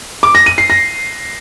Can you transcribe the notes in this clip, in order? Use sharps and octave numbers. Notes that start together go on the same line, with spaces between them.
D6
A#6
D#7
C7
A#6